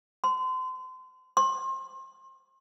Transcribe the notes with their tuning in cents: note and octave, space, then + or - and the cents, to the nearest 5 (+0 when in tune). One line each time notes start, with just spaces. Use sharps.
C6 -35
C6 +30